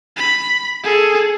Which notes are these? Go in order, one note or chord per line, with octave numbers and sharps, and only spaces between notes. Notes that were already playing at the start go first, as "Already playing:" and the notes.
B5
G#4 A4